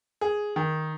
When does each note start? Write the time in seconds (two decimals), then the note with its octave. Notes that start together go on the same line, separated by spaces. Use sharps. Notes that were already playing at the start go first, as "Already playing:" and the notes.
0.21 G#4
0.56 D#3